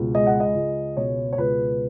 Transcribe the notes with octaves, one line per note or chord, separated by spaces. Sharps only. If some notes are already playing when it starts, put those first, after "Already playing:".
Already playing: C#2 B2
G#3 D#5
F#5
D#5
C#2
B2 C#5
C#5
C#2 B4